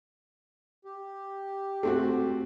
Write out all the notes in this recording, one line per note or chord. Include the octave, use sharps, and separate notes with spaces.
G4
A3 C4 F#4